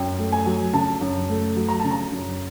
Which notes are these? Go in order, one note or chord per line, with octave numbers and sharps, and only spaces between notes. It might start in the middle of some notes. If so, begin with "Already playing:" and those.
Already playing: F#2 G5
A3
G#5
F#3
C#3 A5
F#2
A3
F#3
A#5
C#3 A5
A#5
F#2